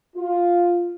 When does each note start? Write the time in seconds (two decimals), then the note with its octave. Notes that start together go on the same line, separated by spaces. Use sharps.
0.16 F4